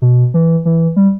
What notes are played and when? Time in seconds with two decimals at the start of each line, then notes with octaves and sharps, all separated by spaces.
0.02 B2
0.34 E3
0.65 E3
0.96 G3